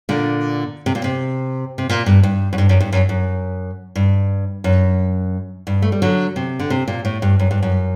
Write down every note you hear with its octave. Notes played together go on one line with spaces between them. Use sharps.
A#2 D3
C3
A#2
C3
C3
A#2
G2
G2
F#2
G2
F#2
G2
F#2
F#2
G2
F#2
G2
A3
G3
D3 F#3
C3
D3
C3
A#2
A2
G2
F#2
G2
F#2